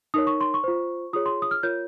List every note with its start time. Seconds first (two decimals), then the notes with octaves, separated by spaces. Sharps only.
0.14 D#4 A#4 C#5 D#6
0.27 C#6
0.41 C6
0.54 C#6
0.64 F4 C5
1.13 F4 G#4 C#5 D#6
1.26 C6
1.42 D#6
1.51 F6
1.63 F4 A#4 C#5 G6